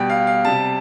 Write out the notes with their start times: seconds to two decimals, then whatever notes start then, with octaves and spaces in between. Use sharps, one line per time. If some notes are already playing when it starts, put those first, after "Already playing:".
Already playing: B2 G3 G5
0.10 F5
0.27 F5
0.45 C3 G3 A5